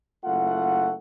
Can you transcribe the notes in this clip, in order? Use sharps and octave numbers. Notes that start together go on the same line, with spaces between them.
F#1 A3 F4 F#5